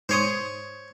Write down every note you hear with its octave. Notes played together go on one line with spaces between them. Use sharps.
G#2 C5 C#5 C6 D#6